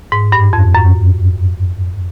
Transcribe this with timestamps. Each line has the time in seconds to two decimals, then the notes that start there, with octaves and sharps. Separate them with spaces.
0.12 G#2
0.32 G2
0.53 F2
0.75 F#2